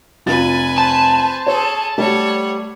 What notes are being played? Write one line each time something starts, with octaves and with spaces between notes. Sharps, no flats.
F1 F4 B4 G#5 A6
C5 A5
G#4 A4 C#5
G3 A3 C#5 F#5